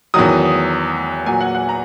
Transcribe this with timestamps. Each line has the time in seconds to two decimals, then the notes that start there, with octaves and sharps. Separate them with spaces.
0.14 E2 D#3 F#3 D#6
1.26 A#2 F#3 G#5
1.41 F#5
1.55 F#5
1.69 A#5